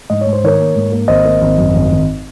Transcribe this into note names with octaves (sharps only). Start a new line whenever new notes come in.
G#2 D#5
C#5
G#2
C5
D#3 A#4 C#5
A#3
G#2
A#3
G#1 C5 D#5
A#3
G#1
F#2
G#1
G#1